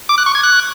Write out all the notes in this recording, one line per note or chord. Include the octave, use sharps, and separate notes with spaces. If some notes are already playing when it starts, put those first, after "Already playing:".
D6
F#6
C#6
G#6
F#6